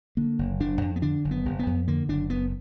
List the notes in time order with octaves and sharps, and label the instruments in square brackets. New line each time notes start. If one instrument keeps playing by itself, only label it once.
[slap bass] D3 A#3
F#1
F#1 D4
F2
B3
D3 D4
F#1
B3
F#1
B3
F2
D3 A#3
F#1 D4
F#1 B3